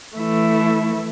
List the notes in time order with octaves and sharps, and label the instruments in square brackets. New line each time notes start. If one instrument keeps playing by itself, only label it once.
[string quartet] E3 A3 E4